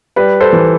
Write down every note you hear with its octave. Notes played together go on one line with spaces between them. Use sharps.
G3 B4
A4 C5
E3